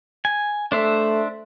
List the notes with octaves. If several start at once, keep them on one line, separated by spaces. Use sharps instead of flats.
G#5
A3 D4 C5 E5